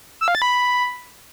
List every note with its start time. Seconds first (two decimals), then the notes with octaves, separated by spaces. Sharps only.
0.21 E6
0.28 F5
0.35 A6
0.42 B5